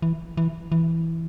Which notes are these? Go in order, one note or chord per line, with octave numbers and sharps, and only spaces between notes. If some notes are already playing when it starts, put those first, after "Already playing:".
E3
E3
E3